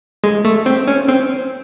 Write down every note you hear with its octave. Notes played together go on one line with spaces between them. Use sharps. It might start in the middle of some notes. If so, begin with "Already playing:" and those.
G#3
A3
C4
C#4
C4